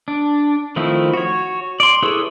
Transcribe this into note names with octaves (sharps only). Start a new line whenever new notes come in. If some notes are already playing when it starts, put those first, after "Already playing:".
D4
D#3 F3 A3 C4 E4
F#4 C#5
D5 C6
E4 G#4 A4 B4 C#5